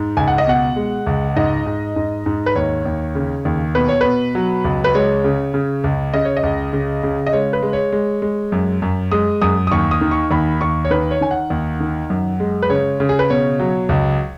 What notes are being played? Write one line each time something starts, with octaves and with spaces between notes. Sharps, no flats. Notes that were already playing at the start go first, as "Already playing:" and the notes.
Already playing: G#2
C#2 G#5
F#5
D#5
B2 F#5
G#3
C#2
G#2 D#5
G#2
G#2
G#2
B4
D#2 C#5
D#2
C#3
D#2
B2 B4
C#5
B2 B4
F#3
C#2
B4
G#3 C#5
C#3
C#3
C#2
C#3 D#5
C#5
D#5
C#2
C#3
C#3
D#5
G#3 C#5
B4
G#3
C#5
G#3
G#3
F#2
F#2
G#3 D#6
F#2 D#6
D#6
D#2 C#6
D#6
D#3
C#6
D#2 B5
D#2 C#6
C#5
D#3 B4
C#5
D#3 G#5
F#5
D#2
D#3
F#2
G#3
B4
C#3 C#5
C#3
G#4
B4
B2 C#5
F#3
C#2